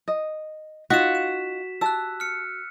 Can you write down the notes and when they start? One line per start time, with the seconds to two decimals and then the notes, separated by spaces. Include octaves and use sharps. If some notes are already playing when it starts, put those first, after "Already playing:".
0.08 D#5
0.90 D#4 F4 F#4 F5 B6 E7
1.15 E7
1.81 G4 A5 E6 F#6
2.20 F6 C#7